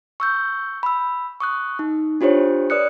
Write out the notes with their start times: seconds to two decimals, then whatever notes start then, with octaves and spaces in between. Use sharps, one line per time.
0.20 C#6 E6 G6
0.83 B5 E6
1.40 C#6 D#6 F#6
1.79 D#4
2.21 D4 F4 G4 C5 C#5
2.70 B4 D5 D#6 F#6 C#7